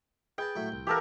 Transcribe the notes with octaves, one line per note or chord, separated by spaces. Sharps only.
G#4 B4 G5 A5
A2 F#3 E5
C2
E3 A#3 B3 G4 A4 A#4